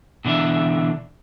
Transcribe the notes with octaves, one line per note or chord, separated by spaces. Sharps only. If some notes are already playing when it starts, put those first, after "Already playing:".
B2 D3 E3 D4 E5